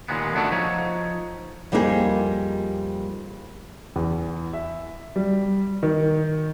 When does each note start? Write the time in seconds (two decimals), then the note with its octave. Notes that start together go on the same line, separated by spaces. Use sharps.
0.08 D#2 A#2 G#3 B3
0.35 A3 B3 D4 F#4 A4
0.52 F3 D#4 C#5
1.72 F2 G3 A#3 D#4 F#4 G#4
3.96 E2
4.53 E5
5.16 G3
5.83 D#3